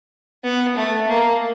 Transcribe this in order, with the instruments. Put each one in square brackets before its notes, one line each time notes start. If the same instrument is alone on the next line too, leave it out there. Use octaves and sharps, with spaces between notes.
[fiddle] B3
A3
A#3